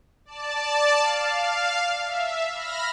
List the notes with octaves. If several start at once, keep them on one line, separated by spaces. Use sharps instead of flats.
D5 A5
F5
E5
B5 F6 A#6